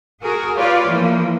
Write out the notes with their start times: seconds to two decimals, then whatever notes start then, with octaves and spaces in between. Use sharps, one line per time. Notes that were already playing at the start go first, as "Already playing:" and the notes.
0.22 F#4 G#4 A#4
0.56 F4 G4 B4 C#5 D5 F5
0.88 E3 F3 A#3